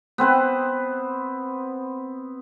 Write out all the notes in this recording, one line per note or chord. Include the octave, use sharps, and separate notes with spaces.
B3 C4 B4 C5